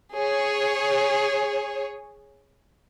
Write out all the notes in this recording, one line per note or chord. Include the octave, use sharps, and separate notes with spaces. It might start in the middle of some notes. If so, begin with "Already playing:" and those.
G#4 C#5